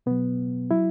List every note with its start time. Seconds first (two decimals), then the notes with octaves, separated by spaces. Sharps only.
0.06 B2 F#3 B3
0.71 F#3 E4